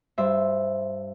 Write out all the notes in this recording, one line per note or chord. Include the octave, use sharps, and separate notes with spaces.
G2 C5 E5